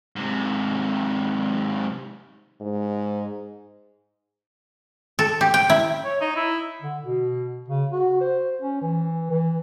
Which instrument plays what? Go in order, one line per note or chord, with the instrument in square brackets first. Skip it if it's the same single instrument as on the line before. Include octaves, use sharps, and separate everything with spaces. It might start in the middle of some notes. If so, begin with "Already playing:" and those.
[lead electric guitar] G#2 C3
[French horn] G#2
[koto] A4
G4
G5
E4
[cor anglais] C#5
D#4
E4
[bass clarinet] D3
B2
C#3
F#4
C5
C#4
E3
E3